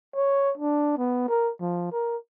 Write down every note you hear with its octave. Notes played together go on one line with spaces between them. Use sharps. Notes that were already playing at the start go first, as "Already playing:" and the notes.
C#5
D4
B3
A#4
F3
A#4